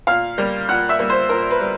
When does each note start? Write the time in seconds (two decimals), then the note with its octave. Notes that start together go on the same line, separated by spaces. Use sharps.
0.07 A#2 F5
0.38 G3 A#3
0.69 A#2 F#5
0.89 E5
0.99 G3 A#3
1.10 C5
1.29 A#2 A#4
1.51 B4
1.61 G3